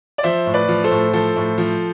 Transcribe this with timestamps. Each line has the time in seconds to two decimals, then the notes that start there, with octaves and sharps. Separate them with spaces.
0.18 D5
0.23 F3 C5 E5
0.46 A2
0.54 B4 D5
0.68 F3
0.84 A4 C5
0.91 A2
1.13 F3 A4 C5
1.36 A2
1.58 F3